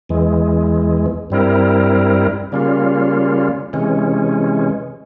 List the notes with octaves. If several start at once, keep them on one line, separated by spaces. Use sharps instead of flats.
E2 E3 G#3
G2 G3 C4 E4 A#4
C#3 G3 A#3 C#4 F4
C3 E3 G#3 C#4